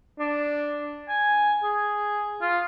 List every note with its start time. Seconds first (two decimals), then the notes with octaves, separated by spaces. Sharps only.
0.19 D4
1.09 G#5
1.63 G#4
2.41 F4